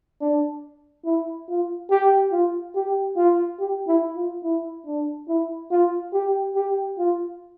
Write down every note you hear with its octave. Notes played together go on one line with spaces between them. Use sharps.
D4
E4
F4
G4
F4
G4
F4
G4
E4
F4
E4
D4
E4
F4
G4
G4
F4